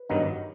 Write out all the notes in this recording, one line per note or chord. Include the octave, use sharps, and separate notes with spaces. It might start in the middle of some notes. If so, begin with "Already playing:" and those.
Already playing: B4
G2 D#3 F#3 B3 D#4